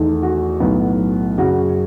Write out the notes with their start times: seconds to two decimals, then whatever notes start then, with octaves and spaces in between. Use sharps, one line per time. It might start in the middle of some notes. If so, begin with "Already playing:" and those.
Already playing: E2 D#3 A3 D#4
0.23 F#4
0.60 B1 A2 F#3 B3 D#4
1.38 F#2 C#3 F#3 C#4 F#4